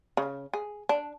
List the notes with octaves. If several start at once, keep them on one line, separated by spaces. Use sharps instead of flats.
C#3
G#4
D4